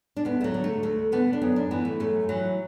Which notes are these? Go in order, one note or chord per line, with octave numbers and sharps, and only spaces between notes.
D4
D2 B3
A3
F#3
D3
A3
D2 A3
D3 B3
D4
F#2 B3
D4
E3 B3
A3
F#2 A3
E3 F#3